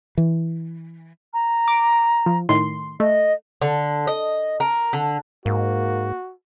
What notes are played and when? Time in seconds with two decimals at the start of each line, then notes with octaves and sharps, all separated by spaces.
0.17 E3
1.34 A#5
1.68 D6
2.26 F3
2.49 A2 D#3 C6
3.00 A3 D#5
3.62 D3
4.07 D#5
4.60 A#4
4.93 D3
5.46 G#2 A#3 F#4